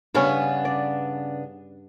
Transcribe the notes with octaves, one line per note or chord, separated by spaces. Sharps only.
G2 C#3 B3 C#4 D4 C#5
D5